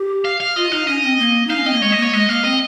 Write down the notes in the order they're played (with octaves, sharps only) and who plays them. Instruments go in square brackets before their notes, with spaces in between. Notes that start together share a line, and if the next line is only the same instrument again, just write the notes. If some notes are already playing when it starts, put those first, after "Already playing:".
Already playing: [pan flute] G4
[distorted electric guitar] F5
F5
[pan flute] F4 [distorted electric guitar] D#5
[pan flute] D#4 [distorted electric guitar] F5
[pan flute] C#4 [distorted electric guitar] D#5
[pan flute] C4
A#3
[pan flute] D#4 [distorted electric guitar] F5
[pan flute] C#4
[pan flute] C4 [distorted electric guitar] D#5
[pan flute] A#3
[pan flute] G#3 [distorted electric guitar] C#5
[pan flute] A#3 [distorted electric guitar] D#5
[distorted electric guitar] C#5
[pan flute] G#3 [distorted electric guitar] D#5
[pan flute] A#3 [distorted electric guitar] F5
[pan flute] C4 [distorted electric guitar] D#5